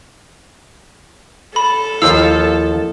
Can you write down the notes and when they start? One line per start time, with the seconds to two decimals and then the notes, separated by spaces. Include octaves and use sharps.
1.56 A4 B5
2.02 D#2 F3 E4 F5 E6